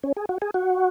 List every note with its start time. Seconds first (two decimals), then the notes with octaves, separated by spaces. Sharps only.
0.03 C#4
0.17 G#4
0.29 F#4
0.42 G#4
0.54 F#4